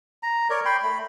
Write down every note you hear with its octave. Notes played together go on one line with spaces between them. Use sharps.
A#5
A#4 C#5 D5
G5 B5 C6
A3 B5